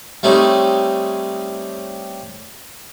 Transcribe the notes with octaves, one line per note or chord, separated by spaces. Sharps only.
G3 A3 C4 C#4 D#4